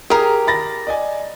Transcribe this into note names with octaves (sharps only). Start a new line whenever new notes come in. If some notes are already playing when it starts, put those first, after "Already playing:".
G4 G#4 A#4 A#5 D#6
B5 A6 A#6
D5 D#5 G#5